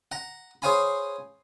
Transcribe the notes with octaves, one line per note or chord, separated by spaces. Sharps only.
F#5 A#5
G#4 C5 C#5 F5 G#5 B5